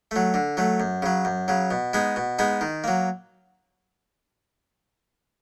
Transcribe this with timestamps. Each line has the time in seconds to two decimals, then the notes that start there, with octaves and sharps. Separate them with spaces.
0.11 F#3 A3
0.34 D3
0.57 F#3 A3
0.80 F#2
1.02 C#3 F#3
1.25 F#2
1.48 C#3 F#3
1.71 B2
1.93 G#3 B3 D#4 G#4
2.16 B2
2.39 G#3 B3 D#4 G#4
2.61 D#3
2.84 F#3 A#3